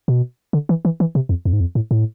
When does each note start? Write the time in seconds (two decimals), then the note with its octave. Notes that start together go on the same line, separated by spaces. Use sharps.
0.08 B2
0.53 D3
0.69 E3
0.85 E3
1.00 E3
1.15 C3
1.29 F2
1.45 F2
1.53 G#2
1.60 F2
1.75 A2
1.91 A2